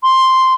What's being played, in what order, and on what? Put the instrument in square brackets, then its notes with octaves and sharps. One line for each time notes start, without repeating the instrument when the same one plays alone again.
[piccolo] C6